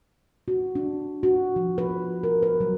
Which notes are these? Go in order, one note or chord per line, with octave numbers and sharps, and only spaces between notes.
F#4
D4
F#4
F3
B4
A#4
B4
F#3